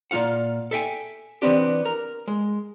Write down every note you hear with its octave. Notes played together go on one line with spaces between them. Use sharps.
A#2 G#3 F4 F5 F#5
A4 E5 G5 G#5
E3 F3 B3 C4 D4 G4
A#4
G#3